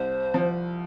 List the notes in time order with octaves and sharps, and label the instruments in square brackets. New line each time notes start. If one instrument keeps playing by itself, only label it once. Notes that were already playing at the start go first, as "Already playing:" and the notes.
Already playing: [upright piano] C2 [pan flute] C5
[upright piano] F3